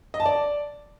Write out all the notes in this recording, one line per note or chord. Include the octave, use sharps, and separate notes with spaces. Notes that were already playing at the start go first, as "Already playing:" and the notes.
D#5
A5
D5